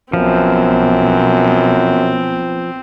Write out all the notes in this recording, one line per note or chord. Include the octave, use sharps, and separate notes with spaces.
B1 F#2 F3 B3 C4